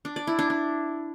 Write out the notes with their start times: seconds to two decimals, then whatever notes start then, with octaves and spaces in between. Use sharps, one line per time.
0.05 D4
0.16 D5
0.27 E4
0.39 D4
0.50 D4